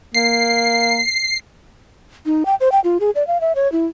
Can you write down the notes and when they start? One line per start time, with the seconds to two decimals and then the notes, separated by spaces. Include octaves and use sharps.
0.15 A#3 C7
2.26 D#4
2.46 G5
2.61 C5
2.72 G5
2.84 F4
3.00 G#4
3.15 D5
3.27 F5
3.41 E5
3.55 C#5
3.72 E4